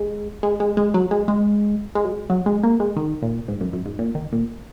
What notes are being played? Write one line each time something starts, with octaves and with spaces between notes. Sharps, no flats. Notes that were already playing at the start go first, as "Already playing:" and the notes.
Already playing: G#3
G#3
G#3
G#3
F#3
G#3
G#3
G#3
F#3
G#3
F#3
G#3
A#3
G#3
D#3
A#2
G#2
F#2
F#2
G#2
A#2
D#3
A#2